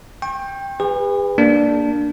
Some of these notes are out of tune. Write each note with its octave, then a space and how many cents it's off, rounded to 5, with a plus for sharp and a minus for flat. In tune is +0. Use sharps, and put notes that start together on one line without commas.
G5 +15 C#6 -40
G#4 -45 B4 +10
A#3 +0 D4 +0